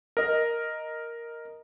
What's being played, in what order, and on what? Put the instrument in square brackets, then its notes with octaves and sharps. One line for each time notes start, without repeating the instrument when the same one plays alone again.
[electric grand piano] A#4 D#5